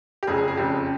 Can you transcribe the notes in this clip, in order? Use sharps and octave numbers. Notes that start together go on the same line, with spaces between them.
G4
F1 F2 C#3 G#4
G#4
G#4
F1 F2 C#3 G4